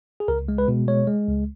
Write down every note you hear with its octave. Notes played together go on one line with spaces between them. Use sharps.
G#4
C#2 A#4
G#3
B4
B2
G#3 C#5
G#3
C#2